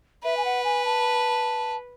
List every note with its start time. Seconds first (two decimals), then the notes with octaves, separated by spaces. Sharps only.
0.24 B4 E5
0.37 G#5
0.45 F#5
0.64 G#5
0.85 A5